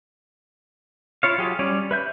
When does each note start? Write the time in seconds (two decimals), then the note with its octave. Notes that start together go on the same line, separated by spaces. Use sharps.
1.23 E4 F4 C#5 F5
1.38 F#3 F4 G4 G#4
1.59 G3 C#4 C#5 D5
1.91 B4 E5 G6